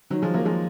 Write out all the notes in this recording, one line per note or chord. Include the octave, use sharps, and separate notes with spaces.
D#3 F#3
F3 G#3
F#3 A#3
F3 G#3